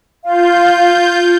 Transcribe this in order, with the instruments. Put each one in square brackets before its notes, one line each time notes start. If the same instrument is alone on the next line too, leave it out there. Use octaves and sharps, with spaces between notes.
[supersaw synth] F4 G6 [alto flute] F5